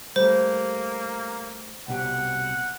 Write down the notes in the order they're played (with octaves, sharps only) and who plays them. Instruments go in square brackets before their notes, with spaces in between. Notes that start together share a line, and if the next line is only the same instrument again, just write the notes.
[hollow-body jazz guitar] G3 A3 [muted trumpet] A#3 [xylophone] C5
[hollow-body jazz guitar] C2 B2 G4 [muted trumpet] F#5